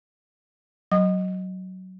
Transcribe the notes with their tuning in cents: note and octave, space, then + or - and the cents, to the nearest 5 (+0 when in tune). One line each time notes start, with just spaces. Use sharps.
F#3 +10 D#5 +0 D#6 -30